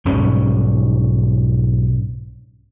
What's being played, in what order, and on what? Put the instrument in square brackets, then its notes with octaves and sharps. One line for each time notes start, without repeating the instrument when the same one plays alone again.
[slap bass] B1 G#2 G3 C#4